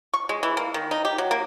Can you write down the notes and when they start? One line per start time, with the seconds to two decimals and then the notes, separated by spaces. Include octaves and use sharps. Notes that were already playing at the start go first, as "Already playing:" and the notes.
0.14 C#6
0.29 G#3
0.43 E3
0.57 A#3
0.74 D#3
0.91 D#4
1.05 G4
1.18 F#3
1.31 A#3